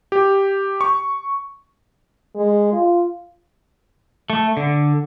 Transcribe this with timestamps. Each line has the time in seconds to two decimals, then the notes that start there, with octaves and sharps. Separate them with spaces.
0.12 G4
0.81 C#6
2.35 G#3
2.73 F4
4.30 A3
4.57 D3